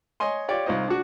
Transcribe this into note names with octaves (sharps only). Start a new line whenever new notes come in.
C#5 D#5 G#5 C6
F4 G4 C#5 D5
C2 D#4 F4 C5 D#5
D4 F#4